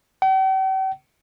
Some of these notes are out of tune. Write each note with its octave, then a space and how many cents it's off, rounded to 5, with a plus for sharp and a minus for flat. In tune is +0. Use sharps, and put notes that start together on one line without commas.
G5 -45